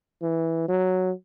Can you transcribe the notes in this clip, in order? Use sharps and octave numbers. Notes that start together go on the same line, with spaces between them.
E3
F#3